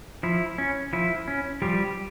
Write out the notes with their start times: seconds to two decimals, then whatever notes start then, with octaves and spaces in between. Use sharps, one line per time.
0.23 F3 E4
0.58 C#4
0.93 F3 E4
1.28 C#4
1.62 F3 G3 G4